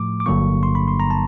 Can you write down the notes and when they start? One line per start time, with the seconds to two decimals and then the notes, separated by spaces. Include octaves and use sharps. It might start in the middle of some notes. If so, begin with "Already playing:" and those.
Already playing: A2 F3 A3 D6
0.20 D6
0.26 G1 G2 D3 F#3 A#3 C#6
0.63 C6
0.75 B5
0.88 C6
1.00 A#5
1.10 A5